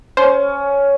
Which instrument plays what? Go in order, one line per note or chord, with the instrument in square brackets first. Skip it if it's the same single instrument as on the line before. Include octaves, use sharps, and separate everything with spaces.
[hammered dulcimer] C#4 [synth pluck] C5